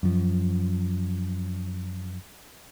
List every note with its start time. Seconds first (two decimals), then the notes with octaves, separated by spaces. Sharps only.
0.03 F#2 F3